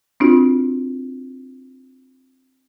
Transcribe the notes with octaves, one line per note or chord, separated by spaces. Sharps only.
C4 D4 F4 F#4